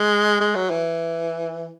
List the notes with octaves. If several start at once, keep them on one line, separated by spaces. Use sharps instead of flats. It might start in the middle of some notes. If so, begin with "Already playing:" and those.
Already playing: G#3
G#3
F#3
E3